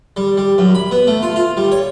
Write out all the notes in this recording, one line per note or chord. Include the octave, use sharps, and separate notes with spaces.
G3
G3
F#2
B5
B3
A3
F4
F4
G3
C#5